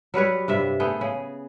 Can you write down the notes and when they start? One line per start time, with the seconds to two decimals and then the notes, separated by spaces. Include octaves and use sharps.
0.14 F#3 G3 B4 C#5
0.48 G2 C3 E5
0.80 A3 B3 G#4 G5
1.01 C#3 G#4